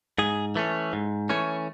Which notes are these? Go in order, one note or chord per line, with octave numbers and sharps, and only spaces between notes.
G#2 G#4
E3 A3 C#4
G#2
E3 A3 C#4 C#5